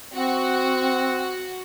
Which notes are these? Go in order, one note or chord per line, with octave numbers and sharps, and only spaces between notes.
C4 F#4